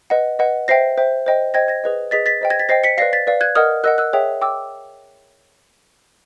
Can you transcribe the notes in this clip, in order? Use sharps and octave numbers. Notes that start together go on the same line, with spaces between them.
B4 D#5 F#5
B4 D#5 F#5
C5 E5 G5 A#6 C7
C5 E5 G5
C5 D#5 G5
C5 D#5 G5 G#6 A#6
G#6 A#6
G#4 B4 D#5
G#4 B4 D#5 A6 B6
A6 B6
C5 D#5 G5
G#6 A#6
A6 B6
C5 D#5 G5 A#6 C7
B6 C#7
B4 D5 F5 A#6 C7
A6 B6
B4 D5 F5
F#6 G#6
A#4 D#5 F#5 D#6 F6
A#4 D#5 F#5 E6 F#6
E6 F#6
G#4 C#5 E5 G5
G5 D6 E6